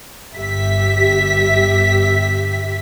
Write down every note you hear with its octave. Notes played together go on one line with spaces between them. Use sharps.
G1 G4 E5 B6